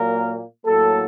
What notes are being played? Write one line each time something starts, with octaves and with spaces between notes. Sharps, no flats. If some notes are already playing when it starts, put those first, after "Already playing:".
Already playing: A#2 F#3 A#3 A#4
A2 F#3 A#3 A4